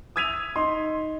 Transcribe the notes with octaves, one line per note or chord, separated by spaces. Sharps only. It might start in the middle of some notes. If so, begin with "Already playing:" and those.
D#6 E6 G#6 B6 D#7 F7
D#4 C6